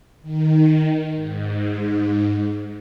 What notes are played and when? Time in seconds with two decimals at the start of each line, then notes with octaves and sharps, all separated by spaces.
0.22 D#3
1.15 G#2